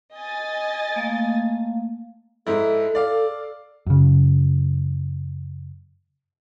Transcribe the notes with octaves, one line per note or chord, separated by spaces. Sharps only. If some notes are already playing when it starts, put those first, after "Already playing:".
D#5 G#5 A6
A3 A#3 F5
G#2 E4 A4
D5 F5
F#2 C#3